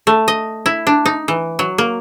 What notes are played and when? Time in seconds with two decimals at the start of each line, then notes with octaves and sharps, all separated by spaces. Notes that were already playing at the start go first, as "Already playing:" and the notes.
0.07 A3
0.28 D#5
0.66 E4
0.87 D4
1.06 D#4
1.28 E3
1.59 F#3
1.78 A#3